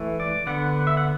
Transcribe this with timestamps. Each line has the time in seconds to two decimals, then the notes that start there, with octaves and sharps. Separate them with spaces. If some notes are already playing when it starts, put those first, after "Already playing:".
Already playing: E3 A3
0.20 D5
0.47 D3 B3 F#5
0.87 E5
0.97 F#5